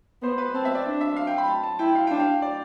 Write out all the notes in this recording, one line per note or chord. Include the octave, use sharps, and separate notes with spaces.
B3 C5
B4
C4 A5
E5
D5
D4
E5
F5
G5
B5
A5
A5
E4 G5
F5
D4 G5
F5
D5